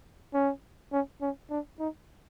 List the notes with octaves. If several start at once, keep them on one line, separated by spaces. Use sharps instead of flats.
C#4
C#4
C#4
D4
D#4